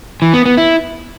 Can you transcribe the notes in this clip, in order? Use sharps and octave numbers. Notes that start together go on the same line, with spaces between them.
E3
B3
B3
E4